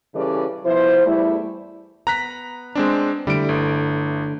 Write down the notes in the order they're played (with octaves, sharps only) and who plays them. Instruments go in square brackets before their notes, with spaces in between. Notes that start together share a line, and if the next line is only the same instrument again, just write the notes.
[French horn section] C#3 E3 G3 C#4 A4 D5
B2 F3 E4 C5
E2 G3 A3 E4
[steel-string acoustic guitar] B3 [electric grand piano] A#5 F#6 B6
[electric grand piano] G#3 C4 D4
[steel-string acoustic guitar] D3 A3 E4 [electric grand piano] G3 D7
[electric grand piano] G1